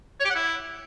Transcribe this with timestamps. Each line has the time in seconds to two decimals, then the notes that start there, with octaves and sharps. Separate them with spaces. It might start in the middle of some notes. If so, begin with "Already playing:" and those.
0.20 C#5
0.25 G4
0.30 F#5
0.35 E4